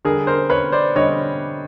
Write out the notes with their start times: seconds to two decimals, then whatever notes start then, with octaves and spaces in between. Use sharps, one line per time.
0.05 D3 G3 G#4 A#4
0.27 A#4 C5
0.50 B4 C#5
0.72 C5 D5
0.95 D3 G3 C#5 D#5